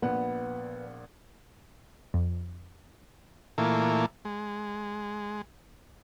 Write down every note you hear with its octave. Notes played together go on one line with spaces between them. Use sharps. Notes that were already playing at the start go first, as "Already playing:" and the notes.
A#1 A#2 B3 F#5
F2
A#2 E3 A3 A#3 E4 F4
G#3